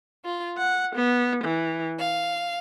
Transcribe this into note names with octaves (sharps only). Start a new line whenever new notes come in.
F4
F#5
B3
E3
F5